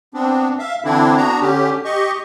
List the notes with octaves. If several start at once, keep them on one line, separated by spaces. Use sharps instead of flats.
B3 C4 D4
E5 F5
D3 E3 C4 D4 E4
B3 D4 F#4 A#5
D3 C#4 G4
G4 D#5 C#6